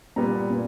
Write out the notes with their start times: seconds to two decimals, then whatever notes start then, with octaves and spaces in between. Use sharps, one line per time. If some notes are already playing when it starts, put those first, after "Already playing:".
0.16 A#2 G3 B3 A#5
0.50 A#2